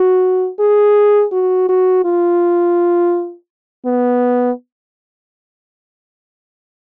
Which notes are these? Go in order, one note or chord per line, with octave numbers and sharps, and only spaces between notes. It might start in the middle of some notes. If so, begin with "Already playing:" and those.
Already playing: F#4
G#4
F#4
F#4
F4
B3